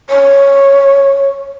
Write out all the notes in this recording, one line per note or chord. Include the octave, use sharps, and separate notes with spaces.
C#5